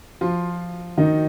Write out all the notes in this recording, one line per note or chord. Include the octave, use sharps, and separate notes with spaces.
F3 F4
D#3 D#4